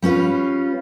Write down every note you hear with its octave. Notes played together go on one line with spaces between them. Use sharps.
G3 C#4 F4 B4